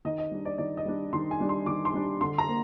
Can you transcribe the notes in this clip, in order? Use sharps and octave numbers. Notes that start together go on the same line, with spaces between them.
D#3 D#5
D#5
G3 D4
D5
D#3 D5
D#5
G3 D4
D#3 C6
G#5
G3 D4
C6
D#3 D6
C6
G3 D4
D3 C6
A#5
A#3